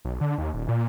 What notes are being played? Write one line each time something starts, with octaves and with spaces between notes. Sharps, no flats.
B1
D3
D#2
D#1
A#2